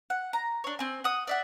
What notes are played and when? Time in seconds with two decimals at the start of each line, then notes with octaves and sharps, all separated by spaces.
0.10 F#5
0.33 A#5
0.64 D4 C#5
0.79 C4 G#5
1.04 F#5 D#6
1.27 D5 E5 F#5